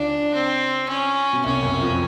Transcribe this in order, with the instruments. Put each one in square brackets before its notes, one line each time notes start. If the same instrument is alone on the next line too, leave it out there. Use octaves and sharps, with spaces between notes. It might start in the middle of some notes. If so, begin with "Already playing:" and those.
Already playing: [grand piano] C#2 C#3 [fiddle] D4
[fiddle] C4
C#4
[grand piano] B2
[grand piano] C2 C3 [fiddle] C#4
[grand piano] F#1 F#2
F2